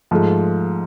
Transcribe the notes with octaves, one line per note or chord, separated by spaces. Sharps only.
G#2 F3 A3